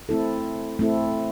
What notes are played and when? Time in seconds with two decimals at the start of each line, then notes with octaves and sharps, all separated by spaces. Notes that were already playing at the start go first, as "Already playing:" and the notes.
0.09 A3 C4 E4 A4
0.79 A3 C4 E4 A4